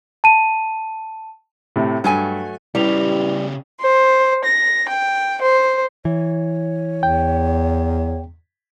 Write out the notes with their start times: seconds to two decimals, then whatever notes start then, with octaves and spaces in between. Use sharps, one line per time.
0.24 A5 D#7
1.76 A2 C3
2.04 G2 F#3 A3 G#5
2.75 C#3 G3 E4 G4 B4 F7
3.80 C5
4.43 A#6
4.88 G5
5.41 C5
6.05 E3 C#5
7.03 E2 G5